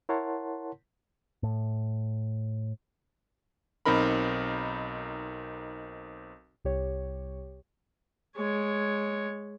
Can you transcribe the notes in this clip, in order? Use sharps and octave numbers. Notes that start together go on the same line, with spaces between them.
E4 A#4 C#5 F#5 A5 C6
A2
B1 C4 D#4 A#4 B5
C2 G4 C#5
G#3 C#5